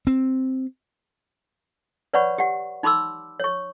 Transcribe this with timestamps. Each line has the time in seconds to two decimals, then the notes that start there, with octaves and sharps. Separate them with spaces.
0.07 C4
2.14 B4 C#5 D5 F#5 B5 C#6
2.38 G4 F#5
2.83 D#4 B5 C6 D6 E6
3.40 C#5 C#6